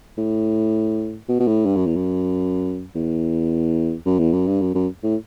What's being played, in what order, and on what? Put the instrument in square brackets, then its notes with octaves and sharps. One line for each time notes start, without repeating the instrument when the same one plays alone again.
[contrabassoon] A2
B2
B2
A2
G2
F#2
E2
F#2
E2
F#2
E2
F#2
G2
F#2
F#2
A2